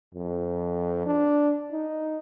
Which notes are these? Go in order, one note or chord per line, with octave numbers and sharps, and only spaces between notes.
F2
D4
D#4